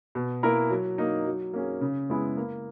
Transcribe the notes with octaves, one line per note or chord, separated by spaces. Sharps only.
B2
A#3 E4 A#4
F#3
A#3 D#4
F#3
A#3 C#4 G#4
C#3
G#3 B3 E4 G#4
A#3